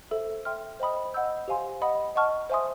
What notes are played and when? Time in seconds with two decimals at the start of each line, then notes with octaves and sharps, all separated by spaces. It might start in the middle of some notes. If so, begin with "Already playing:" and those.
0.11 A4 C5 E5
0.45 E5 G5 C6 F6
0.80 C5 D#5 G5 B5 D#6
1.14 D#5 F#5 B5 E6 G6
1.48 G4 C5 F5 G#5 C6
1.82 D#5 F#5 B5 D#6
2.15 D#5 F#5 A5 C#6 F6
2.50 C5 E5 G#5 C6 D#6